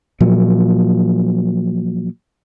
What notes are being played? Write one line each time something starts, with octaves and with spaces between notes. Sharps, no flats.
A#2 F3 F#3